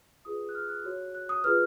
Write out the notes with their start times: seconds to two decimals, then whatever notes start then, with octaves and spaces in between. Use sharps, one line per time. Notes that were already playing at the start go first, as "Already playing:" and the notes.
0.25 F4 G#4 B4 D#6
0.49 F#6
0.55 F6
0.69 F#6
0.84 F#4 C#5
1.15 F#6
1.29 D#6
1.44 F4 G#4 B4 F6